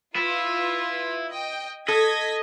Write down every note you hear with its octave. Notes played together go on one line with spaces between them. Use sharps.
E4 F4 B4
D#5 G5
A4 D#5 G#6 A#6 B6